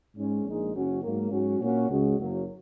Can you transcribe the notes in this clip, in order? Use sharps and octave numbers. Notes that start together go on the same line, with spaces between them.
G#2 G#3 C#4
A#1 A#2 G#3 D#4
F#1 F#2 F#3 C#4 F#4
G#2 F#3 A#3
G#2 F#3 C#4 F#4
A#2 A#3 C#4 F#4
C#2 C#3 G#3 C#4 F#4
F#1 F#2 F#3 A#3